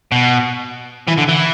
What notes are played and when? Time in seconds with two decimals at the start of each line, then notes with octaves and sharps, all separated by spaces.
0.12 B2
1.08 E3
1.18 D3
1.28 E3